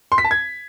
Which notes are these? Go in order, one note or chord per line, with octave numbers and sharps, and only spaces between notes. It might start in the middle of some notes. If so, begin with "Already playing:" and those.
C6
B6
A5
G#6